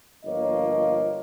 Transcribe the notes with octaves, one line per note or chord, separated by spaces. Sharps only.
G1 F3 A#3 C#5 D#5